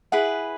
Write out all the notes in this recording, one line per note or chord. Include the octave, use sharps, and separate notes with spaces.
E4 G#4 B4 F#5